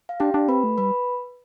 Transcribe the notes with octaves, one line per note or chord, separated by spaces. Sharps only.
F5
D4 G4 G5
D4
C4 B4 B5
A3
G3 B4 B5